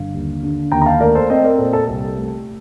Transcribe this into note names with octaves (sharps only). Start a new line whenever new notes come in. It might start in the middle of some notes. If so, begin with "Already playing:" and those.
Already playing: G1 D3 F5
D#2
D3
D#2 G5 A#5
A#5
F5 A5
A3 A#4 D5
A4 C5
C4 C5 D#5
A#4 D5
A#2 A4 C5
A4
C2 A4
A3